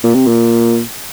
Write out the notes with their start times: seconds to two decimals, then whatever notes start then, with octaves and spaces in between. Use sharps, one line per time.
0.03 A#2
0.15 C3
0.26 A#2